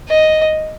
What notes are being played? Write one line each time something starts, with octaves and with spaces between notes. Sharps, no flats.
D#5